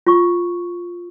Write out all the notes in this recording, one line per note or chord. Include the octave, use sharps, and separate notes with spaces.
F4 C#6